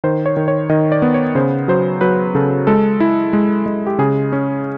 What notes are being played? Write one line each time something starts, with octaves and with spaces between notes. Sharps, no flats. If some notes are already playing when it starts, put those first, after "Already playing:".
D#3 C5
C#5
D#3
C#5
D#3 D#5
D5
B3
C#5
C#3 C5
F#3 C5
F#3 B4
C#3 A4
G#3 A4
E4
G#3
G#3
G4
C#3 G#4
C#4